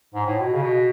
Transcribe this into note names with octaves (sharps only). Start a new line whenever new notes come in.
G#2
A2
B2
C#3
B2